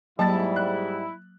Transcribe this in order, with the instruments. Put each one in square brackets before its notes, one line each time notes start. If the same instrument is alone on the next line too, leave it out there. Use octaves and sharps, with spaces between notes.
[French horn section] G#2 G3 [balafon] F#3 A#3 [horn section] E4 [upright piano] A5 A6
[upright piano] F#6